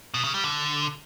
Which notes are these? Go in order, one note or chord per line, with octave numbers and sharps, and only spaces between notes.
B2
C#3
G3
D3